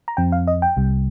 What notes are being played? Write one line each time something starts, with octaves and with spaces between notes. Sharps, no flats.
A#5
F2 F3 C4 G5
F5
D#5
G5
C2 C3 G3